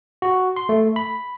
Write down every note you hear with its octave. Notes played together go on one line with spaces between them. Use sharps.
F#4
C6
A3
B5